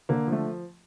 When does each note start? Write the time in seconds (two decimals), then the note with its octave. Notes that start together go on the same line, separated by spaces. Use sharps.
0.09 D3 A#3
0.27 F3
0.32 A3